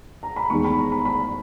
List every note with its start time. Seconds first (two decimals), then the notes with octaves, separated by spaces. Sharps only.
0.23 A#5
0.36 B5
0.50 E2 D#3 G#3 C#6
0.64 B5
0.78 A#5
0.92 B5
1.05 B5